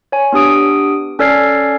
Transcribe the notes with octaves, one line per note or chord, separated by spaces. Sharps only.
C#5 G#5
B3 D4 G4 D#6 D7
C#4 A4 D5 F6 G#6 C7